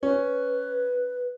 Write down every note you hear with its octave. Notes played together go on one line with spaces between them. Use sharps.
C#4 B4